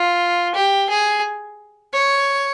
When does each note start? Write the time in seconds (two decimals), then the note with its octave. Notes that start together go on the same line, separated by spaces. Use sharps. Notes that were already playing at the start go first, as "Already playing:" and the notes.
Already playing: F4
0.54 G4
0.89 G#4
1.93 C#5